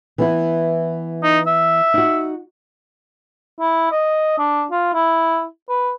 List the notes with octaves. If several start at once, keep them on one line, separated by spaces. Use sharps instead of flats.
E3 B3 E4
D#4
E5
D#4 F#4
E4
D#5
D4
F4
E4
B4